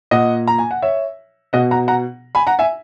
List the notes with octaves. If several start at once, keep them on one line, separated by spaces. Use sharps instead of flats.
A#2 D#5 F#5
A#5
G#5
F#5
C#5 E5
B2 D#5 F#5
F#5 A#5
F#5 A#5
G#5 B5
F#5 A#5
E5 G#5